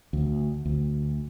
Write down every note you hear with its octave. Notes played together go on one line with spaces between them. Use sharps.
D2
D2